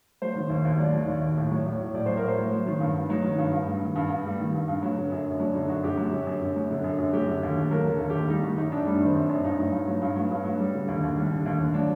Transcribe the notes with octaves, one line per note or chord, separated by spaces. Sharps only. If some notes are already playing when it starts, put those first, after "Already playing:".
F#3 C5
D#3
D#2
D#2
F#3 D5
D#3
D#2
D#2
A2
F#3
A2
F#3
A2 D5
F#3 C5
A#4
A2 C5
F#3
F#3
D#3
G2
G2
F#3 D#4
D#3
G2
G2
G3
D#3
G2
G2
G3
D#3
G2
G2
F#3
D3
F#2
F#2
F#3 D4
D3 D#4
F#2 F#4
F#2 G4
F#3
D3
F#2
F#2
F#3
D3
F#2
F#2
F#3 G4
D3
D#2
D#2
A4
F#3 A#4
D3 A4
D#2
G4
D#2
G3 D#4
D#3 F#4
F#2 D#4
F#2 D4
G3 D4
D#3
C4
F#2
D4
F#2
G2 D#4
F#3
G2
F#3
G2
F#3
G2
F#3
G3
D3
D#2
D#2
G3
D3
D#2
D#2
F#3 D4